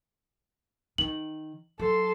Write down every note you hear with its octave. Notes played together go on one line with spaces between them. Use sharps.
D#3 F#7
F#3 A4 C6